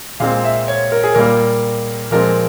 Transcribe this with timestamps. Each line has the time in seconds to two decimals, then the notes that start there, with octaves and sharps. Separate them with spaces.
0.20 A#2 G#3 C4 F5
0.44 E5
0.68 C#5
0.92 A#4
1.04 G#4
1.15 A#2 G3 A#3 A#4
2.11 A#2 F3 G#3 C4 A#4